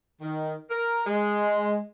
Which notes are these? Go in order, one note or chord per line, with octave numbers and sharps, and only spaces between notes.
D#3
A#4
G#3